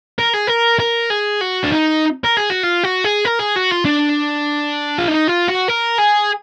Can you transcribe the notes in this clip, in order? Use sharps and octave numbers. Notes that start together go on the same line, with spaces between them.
A#4
G#4
A#4
A#4
G#4
F#4
D4
D#4
A#4
G#4
F#4
F4
F#4
G#4
A#4
G#4
F#4
F4
D4
F4
D#4
F4
F#4
A#4
G#4